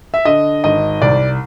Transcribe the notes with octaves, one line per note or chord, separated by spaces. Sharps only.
E5
D3 D#5
G#1 D#5
C2 D5